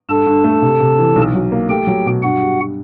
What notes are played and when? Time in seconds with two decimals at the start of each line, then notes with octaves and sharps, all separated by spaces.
0.09 G2 A4 A5
0.26 G2
0.44 A3
0.62 C3
0.80 C3
0.99 E3
1.16 B1
1.34 F#3
1.52 A#3
1.69 A3 G4 G5
1.87 F#3
2.06 B2
2.23 G2 F#4 F#5
2.40 G3